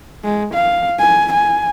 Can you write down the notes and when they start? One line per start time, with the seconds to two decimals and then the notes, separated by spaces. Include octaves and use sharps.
0.24 G#3
0.55 F5
0.99 G#5
1.34 G#5